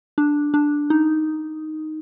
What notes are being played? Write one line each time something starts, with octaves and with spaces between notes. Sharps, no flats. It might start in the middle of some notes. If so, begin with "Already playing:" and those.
D4
D4
D#4